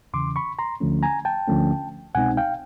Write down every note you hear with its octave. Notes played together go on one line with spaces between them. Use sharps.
E2 C#3 E3 C6 D6
B5 C#6
A#5 C6
D2 D3 F3 A3 C#4
G#5 A#5
G5 A5
D2 D3 F3 A3 C#4
C2 B2 G#3 C4 D#4 F#5 G#5
F5 G5